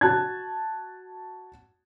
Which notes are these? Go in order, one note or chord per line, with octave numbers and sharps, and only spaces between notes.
F#4 A5 F#6 G#6